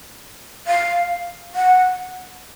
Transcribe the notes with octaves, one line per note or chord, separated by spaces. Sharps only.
F5
F#5